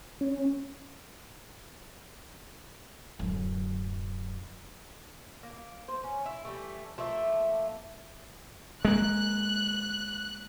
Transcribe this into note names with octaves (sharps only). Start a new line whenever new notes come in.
C#4
D1 F#2
A#3
C5
C#4
E4
E3 G3 A3
F3 A3 A#3 E5
G#3 A#3 F#6